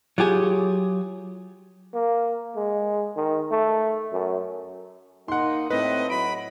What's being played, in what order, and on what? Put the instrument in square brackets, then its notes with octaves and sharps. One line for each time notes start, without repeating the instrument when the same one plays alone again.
[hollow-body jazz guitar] F#3 F4 G4 G#4
[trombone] A#3
G#3
D#3
A3
F#2
[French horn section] A#3 D#4 [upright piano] F#5 C6
[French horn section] A2 [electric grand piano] C4 B4 [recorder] D#5
[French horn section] F#3 E4 [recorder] B5 [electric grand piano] D7